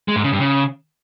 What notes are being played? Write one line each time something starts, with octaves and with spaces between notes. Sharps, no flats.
G#3
G#2
C#3
G2
C#3